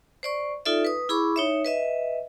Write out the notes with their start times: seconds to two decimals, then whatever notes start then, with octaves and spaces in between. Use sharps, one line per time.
0.23 C5 D5 C#6
0.66 D#4 F4 A4 D5 E5
0.85 B4 D#6
1.09 E4 G#4 B5 C#6 D6
1.36 D#4 C#5 E5
1.64 B4 D#5 E5